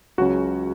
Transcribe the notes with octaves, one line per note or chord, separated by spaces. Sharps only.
C#2 C#3 F#3 C#4 F#4